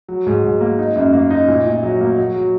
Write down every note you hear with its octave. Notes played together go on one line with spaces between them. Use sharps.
F#3
G#2
G#2
A#3
D#4
F#2
A#3
D#4
A#2
A#2
F#3
A#3
F#3
F#3